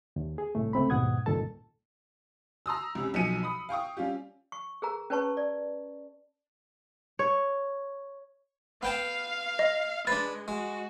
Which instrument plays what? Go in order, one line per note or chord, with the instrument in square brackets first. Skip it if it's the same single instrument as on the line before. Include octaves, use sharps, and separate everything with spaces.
[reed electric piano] D#2
G#4
C2 A2 A3
C#2 A3 C4 B5
D#2 G#2 B2 F#5 D#6 G#6
C#2 G2 A#2 D#3 A4 A5
[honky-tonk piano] A#5 C6 D#6 E6
C#2 C3 C#4
B1 B2 F3 G#5 C#7 D#7
B5 D#6
F5 G5 C#6 D#6
G3 C#4 F4 G4
[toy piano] C#6
G#4 A#4 A#5
C#4 B4 C#5 A5 C#6
D5
[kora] C#5
[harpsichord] B3 G5 A5 [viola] F5
[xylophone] D#5
[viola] G#3 [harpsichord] D4 B4 [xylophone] A6
[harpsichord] G#3 [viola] F#4